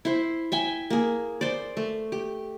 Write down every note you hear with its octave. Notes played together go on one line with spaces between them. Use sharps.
E4 C5
E5 G5 G#5
A#3 G#4
C5 D5
A3
G4